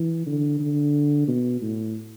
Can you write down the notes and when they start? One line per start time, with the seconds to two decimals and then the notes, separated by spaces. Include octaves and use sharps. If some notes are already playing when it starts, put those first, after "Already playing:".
Already playing: E3
0.26 D3
0.60 D3
1.28 B2
1.61 A2